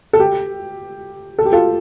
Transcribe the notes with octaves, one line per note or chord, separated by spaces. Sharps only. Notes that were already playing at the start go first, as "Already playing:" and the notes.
A4
G4
A4
G4
F4 A4